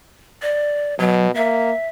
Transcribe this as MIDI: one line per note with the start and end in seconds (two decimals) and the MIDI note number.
0.42 0.95 74
0.99 1.33 47
0.99 1.28 54
1.35 1.71 58
1.35 1.88 76